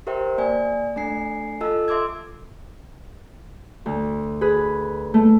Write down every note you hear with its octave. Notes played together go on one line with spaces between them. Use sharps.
G4 A#4 C5 E5 G5
A#3 D5 G#5
A3 D4 G#5 C7
F4 A4 D#5 A5 E6
E5 C6 D6 E6 G#6
D2
G#4 B4
A3